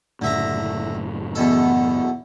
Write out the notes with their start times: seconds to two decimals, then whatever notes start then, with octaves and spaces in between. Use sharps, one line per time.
0.22 F#1 A2 D3 E5 A#5
1.35 E2 B2 A4